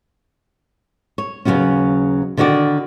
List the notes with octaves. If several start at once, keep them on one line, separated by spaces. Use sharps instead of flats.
C#5
D#2 C#3 E3 F#3 B3 C#4
D3 D#3 D4 F#4 D5